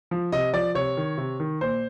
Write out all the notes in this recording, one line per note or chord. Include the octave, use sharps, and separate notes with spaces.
F3
C3 D#5
F3 D5
C3 C#5
D#3
C3
D#3
A#2 C5